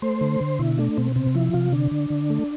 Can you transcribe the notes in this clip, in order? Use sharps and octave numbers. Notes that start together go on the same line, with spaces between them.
A3 C5
D3
D3
B2 E4
A3 D4
B2 C4
C3 C4
F3 E4
C3 F4
D3 D4
D3
D3
A3